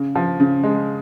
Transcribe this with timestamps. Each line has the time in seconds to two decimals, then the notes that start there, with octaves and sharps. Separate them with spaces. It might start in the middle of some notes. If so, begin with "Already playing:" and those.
Already playing: C#3
0.15 F3
0.40 C#3
0.64 G#3